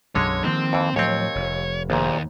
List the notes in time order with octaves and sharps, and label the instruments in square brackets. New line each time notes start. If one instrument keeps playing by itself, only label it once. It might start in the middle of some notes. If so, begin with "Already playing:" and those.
[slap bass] B1 F#2 [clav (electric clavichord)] D3 G#3 [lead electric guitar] C#5
[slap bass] D#3 F3 A#3 [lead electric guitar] C4 C5
[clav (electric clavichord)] F2 E3
[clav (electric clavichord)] D#2 C4 [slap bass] A2 F3 F#3 [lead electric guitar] C#5
[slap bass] F1
[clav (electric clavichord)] A#1 A#2 [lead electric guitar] D#2